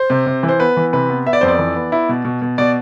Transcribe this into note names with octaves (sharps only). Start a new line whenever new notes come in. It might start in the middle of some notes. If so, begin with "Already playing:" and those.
Already playing: C5
C3
C3
E3
C5
B3 B4
E3
C3 B4
B3
B3 E5
D5
F2 C5
D5
E3
B3
E4
B2
B2
B2
B2 D5